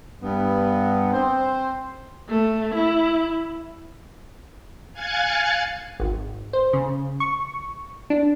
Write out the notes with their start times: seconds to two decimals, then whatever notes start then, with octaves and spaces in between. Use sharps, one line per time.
0.21 G2 B3
1.12 C4 C5
2.29 A3
2.74 E4
4.93 F5 G#5 F#6 G#6 A6 C#7
6.00 G#1
6.53 C5
6.73 C#3
7.20 C#6
8.10 D4